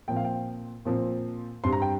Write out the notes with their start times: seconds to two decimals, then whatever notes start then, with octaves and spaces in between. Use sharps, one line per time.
0.08 A#2 F3 C4 G5
0.16 F5
0.24 G5
0.85 A#2 F3 C4
1.64 G2 G3 C4 C6
1.73 A#5
1.82 G5